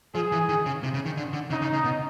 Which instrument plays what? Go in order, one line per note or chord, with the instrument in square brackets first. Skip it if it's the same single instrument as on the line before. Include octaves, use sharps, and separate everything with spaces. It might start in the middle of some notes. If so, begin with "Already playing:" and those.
[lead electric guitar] F3 [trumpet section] G#4
[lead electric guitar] E3
D#3
C#3
C3
C#3
D#3
D3
D3
[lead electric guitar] C#3 [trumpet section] D#4
[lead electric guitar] C#3
C#3
B2